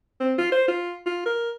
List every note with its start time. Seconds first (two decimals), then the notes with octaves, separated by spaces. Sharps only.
0.20 C4
0.38 F4
0.52 C5
0.68 F4
1.06 F4
1.26 A#4